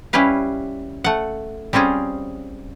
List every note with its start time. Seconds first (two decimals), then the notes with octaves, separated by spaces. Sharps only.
0.13 G3 C#4 E4 G4 B4 F5
1.04 A3 F#5
1.73 G3 C4 C#4 F4 G#4